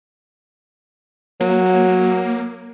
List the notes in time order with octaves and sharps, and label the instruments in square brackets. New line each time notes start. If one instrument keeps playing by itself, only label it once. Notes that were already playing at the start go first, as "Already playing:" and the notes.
[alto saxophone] F#3 [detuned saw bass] A#3